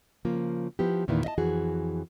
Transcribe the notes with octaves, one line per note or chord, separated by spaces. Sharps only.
C#3 F3 A#3 F4
F3 B3 E4 G4
E2 A#2 D#3 A3 B3 E4
D#5 E5 A5
F2 E3 F#4 G#4